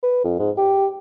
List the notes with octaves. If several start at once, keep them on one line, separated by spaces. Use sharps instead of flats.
B4
F2
G#2
G4